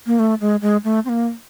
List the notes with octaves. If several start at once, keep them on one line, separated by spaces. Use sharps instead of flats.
A#3
A3
G#3
G#3
A3
C4
A#3